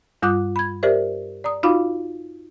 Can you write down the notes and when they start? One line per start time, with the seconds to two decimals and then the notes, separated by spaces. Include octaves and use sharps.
0.22 G2 G3 F4 D6 D#6 F#6
0.56 B5 G#6
0.83 G4 A#4 C5 D5 E5
1.44 D5 A#5 D#6
1.63 D#4 F4 F#4 F5 B5 D6